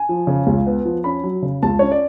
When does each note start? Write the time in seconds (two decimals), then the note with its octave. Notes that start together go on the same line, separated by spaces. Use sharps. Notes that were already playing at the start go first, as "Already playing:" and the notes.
Already playing: G#5
0.09 F3
0.27 C#3
0.47 C#2
0.67 B3
0.85 F3
1.04 C#4 B5
1.24 F#3
1.42 C#3
1.63 C#2 A5
1.79 C#4 C#5
1.92 D5